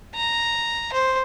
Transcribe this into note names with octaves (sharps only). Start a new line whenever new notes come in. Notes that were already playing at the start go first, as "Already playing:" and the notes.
A#5
C5